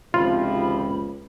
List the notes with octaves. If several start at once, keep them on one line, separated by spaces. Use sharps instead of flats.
G#1 C#2 C3 F3 F4 B5